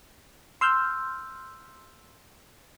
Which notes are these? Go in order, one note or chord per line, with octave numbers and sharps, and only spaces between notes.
C6 E6 F6 G6